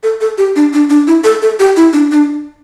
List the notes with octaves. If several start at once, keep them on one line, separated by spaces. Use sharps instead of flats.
A4
A4
G4
D4
D4
D4
E4
A4
A4
G4
E4
D4
D4